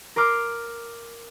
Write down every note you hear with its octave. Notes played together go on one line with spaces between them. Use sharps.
A#4 C6 D6 F6